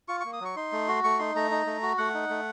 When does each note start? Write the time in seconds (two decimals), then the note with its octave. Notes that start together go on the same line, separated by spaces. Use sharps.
0.08 F4 C#6
0.20 A#3 C#6
0.33 D#6
0.41 F#3 C#6
0.56 D#4 C6
0.72 A3
0.88 F#4
1.04 A3 C#6
1.19 D#4 C6
1.35 A3 A#5
1.51 D#4
1.66 A3
1.82 F#4
1.98 A3 F#5
2.14 D#4
2.30 A3